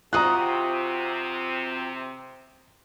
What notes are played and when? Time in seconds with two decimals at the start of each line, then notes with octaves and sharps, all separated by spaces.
0.13 C3 C4 F4 F#4 A#5 D#6 F#6